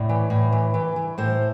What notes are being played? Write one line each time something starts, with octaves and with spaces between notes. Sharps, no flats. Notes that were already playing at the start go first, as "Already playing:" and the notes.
Already playing: A2 D5
E3
A2
E3
E3
E3
A2 C5